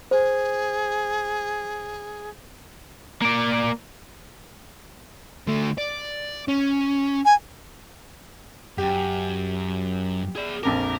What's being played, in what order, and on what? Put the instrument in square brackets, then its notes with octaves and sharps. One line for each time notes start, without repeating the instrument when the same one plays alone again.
[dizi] G#4 [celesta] C5
[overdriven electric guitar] A#3 D5
[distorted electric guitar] D3 A3
D5
C#4
[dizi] G#5
[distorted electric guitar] F#2 [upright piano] G4
[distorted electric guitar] G#4 D5
[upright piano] A#1 F2 D6 [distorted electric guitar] A#4